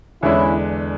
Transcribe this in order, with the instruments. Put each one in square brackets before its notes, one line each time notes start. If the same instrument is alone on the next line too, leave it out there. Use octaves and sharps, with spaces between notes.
[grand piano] E2 D3 G#3 D4 [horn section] C#4 E4